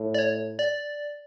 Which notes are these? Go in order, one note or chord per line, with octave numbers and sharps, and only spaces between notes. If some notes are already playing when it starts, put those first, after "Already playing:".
Already playing: A2
D5
C#5
D5